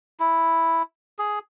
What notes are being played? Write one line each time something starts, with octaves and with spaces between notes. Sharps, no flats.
E4
G#4